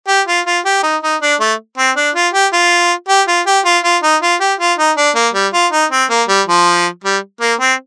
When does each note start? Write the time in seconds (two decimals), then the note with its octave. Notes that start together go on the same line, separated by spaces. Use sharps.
0.08 G4
0.28 F4
0.46 F4
0.65 G4
0.83 D#4
1.03 D#4
1.22 D4
1.40 A3
1.78 C4
1.97 D4
2.15 F4
2.33 G4
2.53 F4
3.09 G4
3.28 F4
3.46 G4
3.65 F4
3.84 F4
4.03 D#4
4.22 F4
4.41 G4
4.60 F4
4.78 D#4
4.97 D4
5.15 A#3
5.34 G3
5.54 F4
5.72 D#4
5.91 C4
6.10 A#3
6.28 G3
6.47 F3
7.04 G3
7.41 A#3
7.60 C4